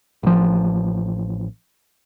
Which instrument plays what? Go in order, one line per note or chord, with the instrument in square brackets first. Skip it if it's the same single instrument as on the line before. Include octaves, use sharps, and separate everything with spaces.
[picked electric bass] A1 F3